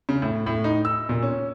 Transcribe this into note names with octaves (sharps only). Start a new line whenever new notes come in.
C#3
A2
A2
D#4
E6
A#2
C#4